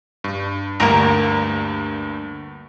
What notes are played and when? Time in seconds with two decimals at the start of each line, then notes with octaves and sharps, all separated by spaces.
0.24 G2
0.80 D2 G2 A#3 A#4 D7